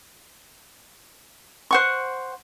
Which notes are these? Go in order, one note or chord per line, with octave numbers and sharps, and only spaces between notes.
C5 F#5 C#6